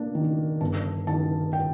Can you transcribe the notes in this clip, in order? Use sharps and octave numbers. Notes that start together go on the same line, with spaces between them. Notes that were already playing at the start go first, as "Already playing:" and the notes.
Already playing: A#3 D4
D#3
G1 A5
D#3 A5
G5